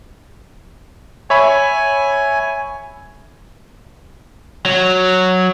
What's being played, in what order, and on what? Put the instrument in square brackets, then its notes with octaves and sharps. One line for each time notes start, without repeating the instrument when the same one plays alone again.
[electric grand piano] C#5 E5 B5 [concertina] G#5
[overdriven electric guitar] F#3